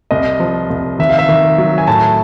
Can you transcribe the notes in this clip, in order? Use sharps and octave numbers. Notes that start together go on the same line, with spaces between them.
C2 D#5
F3
C2
D#3 E5
F5
E5
D#3
F#3
G#5
A2 A5